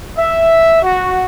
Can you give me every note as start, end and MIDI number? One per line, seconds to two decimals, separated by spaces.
0.17 0.82 76
0.82 1.24 66